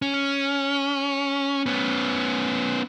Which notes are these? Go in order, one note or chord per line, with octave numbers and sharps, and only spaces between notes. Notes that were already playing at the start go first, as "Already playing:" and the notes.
C#4
B3 C#4